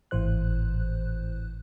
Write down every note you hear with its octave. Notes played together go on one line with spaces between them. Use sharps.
G#1 A2 E3 C5 F#6